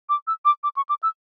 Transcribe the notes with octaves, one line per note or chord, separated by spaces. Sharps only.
D6
E6
D6
D6
C#6
D6
E6